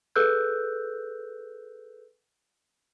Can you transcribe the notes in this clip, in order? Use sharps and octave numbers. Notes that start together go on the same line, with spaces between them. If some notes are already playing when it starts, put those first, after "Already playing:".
G#4 A4 B4 E6 F#6 G6